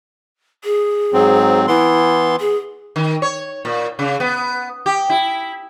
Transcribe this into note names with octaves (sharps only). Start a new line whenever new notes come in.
G#4
G#2 F#3 C4
E3 B3 E4 C6
G#4
D#3
C#5
A#2
C#3
B3
G4
E4